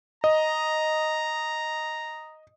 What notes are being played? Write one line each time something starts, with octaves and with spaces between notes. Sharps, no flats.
D#5 A#5